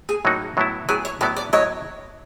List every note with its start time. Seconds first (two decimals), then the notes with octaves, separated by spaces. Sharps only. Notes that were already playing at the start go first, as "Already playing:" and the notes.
0.09 G#4
0.25 A2 F#3 A#3 D#4 F#4
0.57 A2 F#3 B3 E4
0.89 A2 F#3 B3 E4 G#4
1.05 C#5
1.21 A2 F#3 B3 E4 D5
1.37 D5
1.53 A2 F#3 B3 E4 C#5 D#5